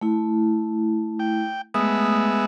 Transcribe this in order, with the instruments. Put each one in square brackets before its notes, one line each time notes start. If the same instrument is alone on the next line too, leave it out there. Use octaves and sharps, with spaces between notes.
[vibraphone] A3 E4
[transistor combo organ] G5
[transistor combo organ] G#3 B3 E5 [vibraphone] A3 D#6